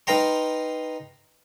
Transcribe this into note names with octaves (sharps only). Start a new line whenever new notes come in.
D#4 B4 F5 G5 A#5 C6